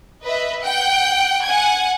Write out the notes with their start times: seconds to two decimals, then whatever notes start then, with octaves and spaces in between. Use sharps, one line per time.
0.24 B4 D#5 E5
0.61 F#5 G5
1.45 F#5 G#5 G#6